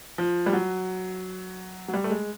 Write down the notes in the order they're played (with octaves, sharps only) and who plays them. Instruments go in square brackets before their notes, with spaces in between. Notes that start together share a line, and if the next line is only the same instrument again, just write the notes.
[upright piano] F3
G3
F#3
F#3
G3
A3
G#3